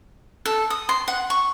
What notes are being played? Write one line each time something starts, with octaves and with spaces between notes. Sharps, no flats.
A4
D#6
C6
F#5
C#6